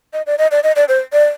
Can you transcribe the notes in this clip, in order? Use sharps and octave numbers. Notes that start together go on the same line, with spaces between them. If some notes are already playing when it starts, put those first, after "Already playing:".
D#5
D5
D#5
D5
D#5
D5
C5
D5